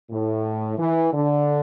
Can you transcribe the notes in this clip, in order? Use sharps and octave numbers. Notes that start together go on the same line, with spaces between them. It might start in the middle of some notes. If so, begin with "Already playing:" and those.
A2
E3
D3